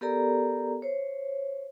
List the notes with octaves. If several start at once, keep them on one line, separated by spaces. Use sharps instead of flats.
B3 G4 A4 A#4 D5 A#5
C5 C#5